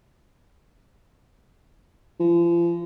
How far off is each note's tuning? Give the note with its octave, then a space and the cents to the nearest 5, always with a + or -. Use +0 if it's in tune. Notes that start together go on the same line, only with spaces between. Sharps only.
F3 -40